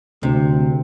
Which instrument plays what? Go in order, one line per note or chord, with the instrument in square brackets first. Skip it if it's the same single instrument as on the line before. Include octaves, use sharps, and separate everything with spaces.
[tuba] D2 [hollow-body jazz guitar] C3